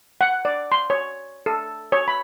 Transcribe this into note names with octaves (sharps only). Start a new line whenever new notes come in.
F#5
D5
C6
C#5
A4
C#5
B5